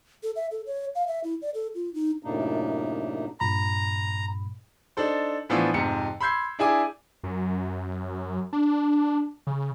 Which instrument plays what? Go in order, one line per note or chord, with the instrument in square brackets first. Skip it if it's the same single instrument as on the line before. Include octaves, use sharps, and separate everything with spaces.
[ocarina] A4
E5
A4
C#5
F5
E5
E4
D5
A4
F4
D#4
[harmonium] F#2 A2 C3 A#3 D4 D#4
[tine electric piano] G2 A#2 B5 [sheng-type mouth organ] A#5
[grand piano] D4 D#4 A4 C5
A2 E3 F3 B3 D4 F4
F2 G#2 C3 C#7
B5 C6 E6 G6 G#6 C7
D4 E4 G#4 E5 G#5 D6
[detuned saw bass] F#2
D4
C#3